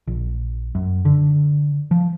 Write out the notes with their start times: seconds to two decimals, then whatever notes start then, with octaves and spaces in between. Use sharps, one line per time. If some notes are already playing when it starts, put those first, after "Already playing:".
0.07 A#1
0.75 F#2
1.05 D3
1.91 F3